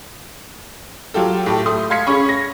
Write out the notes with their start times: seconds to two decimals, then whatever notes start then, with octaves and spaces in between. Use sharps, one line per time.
1.14 F#3 F4 G4 A4
1.46 A2 G4 A4
1.66 A3 C6 D#6
1.90 F5 C6 G#6 B6 C#7
2.07 C#4 G#4 B5 C#6
2.29 A#6